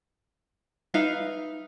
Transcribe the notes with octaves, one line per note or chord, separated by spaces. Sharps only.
D#4 B4 E5 F5